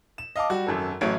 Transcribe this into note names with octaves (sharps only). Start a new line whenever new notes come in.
E7
D#5 F5 A5 D6
G3 F#4
G#1 F#2 A4
A1 F#3 A3 C#5 D7